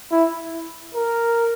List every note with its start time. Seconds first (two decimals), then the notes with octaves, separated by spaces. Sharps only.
0.12 E4
0.95 A#4